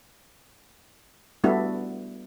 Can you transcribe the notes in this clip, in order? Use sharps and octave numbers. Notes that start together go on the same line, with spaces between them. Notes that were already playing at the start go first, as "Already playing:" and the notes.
G3 A3 B3 D4 E4 F#4